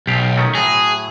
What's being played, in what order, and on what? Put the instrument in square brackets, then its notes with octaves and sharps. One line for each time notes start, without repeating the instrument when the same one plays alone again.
[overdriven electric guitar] B1 [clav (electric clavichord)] G4 F5
[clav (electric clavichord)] D#3 A3 C#4
[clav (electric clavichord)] A2 F#3 A#5 [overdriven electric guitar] G#4